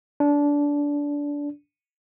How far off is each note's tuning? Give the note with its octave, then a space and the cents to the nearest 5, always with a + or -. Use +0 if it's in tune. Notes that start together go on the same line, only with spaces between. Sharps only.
D4 -20